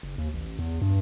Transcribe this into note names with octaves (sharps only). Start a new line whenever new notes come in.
F#1
D#2
A1
E2
G2